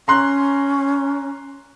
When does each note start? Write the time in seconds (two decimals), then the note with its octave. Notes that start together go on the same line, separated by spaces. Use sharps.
0.08 C#4 A#5 C6 F#6